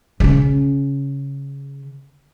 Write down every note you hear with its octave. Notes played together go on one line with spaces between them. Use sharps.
C#3 C#4